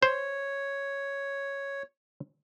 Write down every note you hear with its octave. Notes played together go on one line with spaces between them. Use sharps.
C5 C#5